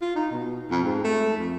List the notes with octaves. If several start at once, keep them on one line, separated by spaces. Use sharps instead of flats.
F4
D#4
B2
F2
G#2
A3
F2